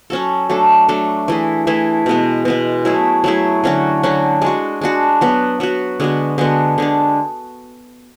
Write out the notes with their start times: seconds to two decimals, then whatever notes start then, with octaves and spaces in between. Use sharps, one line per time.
0.10 F#3 C#4 F#4 A4
0.49 F#3 A3 D4 A4
0.88 F#3 A3 D4 A4
1.28 E3 A3 E4 G#4
1.67 E3 A3 E4 G#4
2.06 B2 G#3 B3
2.45 B2 G#3 B3
2.85 F#3 A3 E4 G#4
3.24 F#3 A3 E4 G#4
3.64 D3 F#3 C#4 F#4
4.03 D3 F#3 C#4 F#4
4.42 G#3 D4 F#4
4.81 G#3 D4 F#4
5.21 F#3 B3 F#4
5.60 F#3 B3 F#4
6.00 D3 G#3 B3 F#4
6.38 D3 G#3 B3 F#4
6.78 D3 G#3 D4